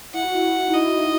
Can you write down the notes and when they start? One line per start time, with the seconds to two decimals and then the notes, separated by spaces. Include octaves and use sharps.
0.14 E4 F#5
0.23 F#4
0.34 E4
0.68 D#4
0.73 E4 D#5